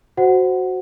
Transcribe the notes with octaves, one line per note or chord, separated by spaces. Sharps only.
F#4 C5 F#5